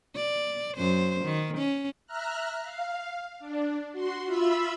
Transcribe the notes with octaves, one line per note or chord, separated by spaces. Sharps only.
D5
F#2 C5
D#3
C#4
E5 A#5 F6 F#6
F5
D4
F#4 C6
F4 E5 B5 E6